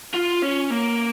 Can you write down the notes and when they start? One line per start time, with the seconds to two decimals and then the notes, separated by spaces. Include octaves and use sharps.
0.14 F4
0.43 C#4
0.71 A#3